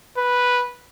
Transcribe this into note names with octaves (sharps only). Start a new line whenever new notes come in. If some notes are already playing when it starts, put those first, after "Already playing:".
B4